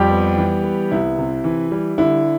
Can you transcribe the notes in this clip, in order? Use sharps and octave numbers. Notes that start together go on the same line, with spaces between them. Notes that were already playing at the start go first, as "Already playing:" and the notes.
Already playing: F2 G3 G4
B3
E3
B3
C2 E4
C3
E3
G3
D3 E4